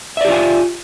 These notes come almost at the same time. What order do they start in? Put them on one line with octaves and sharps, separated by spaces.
E5 D5 G4 F4 G#5